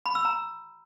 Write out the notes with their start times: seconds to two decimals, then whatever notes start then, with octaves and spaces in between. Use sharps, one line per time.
0.06 B5
0.15 E6
0.25 A#5